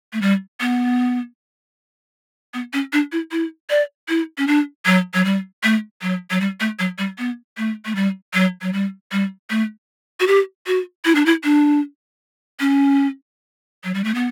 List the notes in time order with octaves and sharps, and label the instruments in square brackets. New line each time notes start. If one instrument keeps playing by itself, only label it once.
[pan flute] A3
G3
B3
B3
C#4
D4
E4
E4
D5
E4
C#4
D4
F#3
F#3
G3
A3
F#3
F#3
G3
A3
F#3
G3
B3
A3
A3
G3
F#3
F#3
G3
G3
A3
F#4
G4
F#4
E4
D4
E4
D4
C#4
F#3
G3
A3
B3